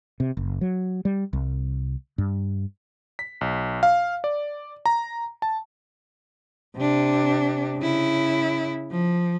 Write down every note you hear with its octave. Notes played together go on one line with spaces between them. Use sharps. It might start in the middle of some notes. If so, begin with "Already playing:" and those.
C3
F#1
F#3
G3
C2
G2
B6
B1
F5
D5
A#5
A5
C3 D4
C#3 E4
F3